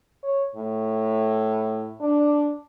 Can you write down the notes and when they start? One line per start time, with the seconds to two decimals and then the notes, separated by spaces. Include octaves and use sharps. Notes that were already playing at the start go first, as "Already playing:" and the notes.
0.23 C#5
0.56 A2
2.01 D4